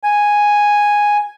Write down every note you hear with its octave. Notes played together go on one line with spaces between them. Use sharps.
G#5